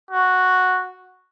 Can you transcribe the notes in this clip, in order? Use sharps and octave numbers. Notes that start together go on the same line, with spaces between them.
F#4